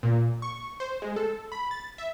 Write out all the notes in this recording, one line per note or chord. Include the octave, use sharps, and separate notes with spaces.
A#2
C#6
C5
G#3
A4
B5
A6
E5